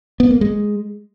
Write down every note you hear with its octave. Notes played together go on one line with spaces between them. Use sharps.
B3
A#3
G#3